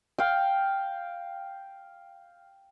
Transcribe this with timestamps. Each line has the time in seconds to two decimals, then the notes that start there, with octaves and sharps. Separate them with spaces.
0.18 F5 G5